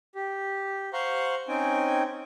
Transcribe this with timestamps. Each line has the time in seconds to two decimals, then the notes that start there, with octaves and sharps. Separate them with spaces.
0.15 G4
0.93 C5 F5 F#5 A#5 C6 C#6
1.48 C4 C#4 D#4 G5 G#5